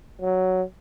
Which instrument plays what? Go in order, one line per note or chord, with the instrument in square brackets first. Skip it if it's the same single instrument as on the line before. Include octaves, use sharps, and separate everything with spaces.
[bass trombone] F#3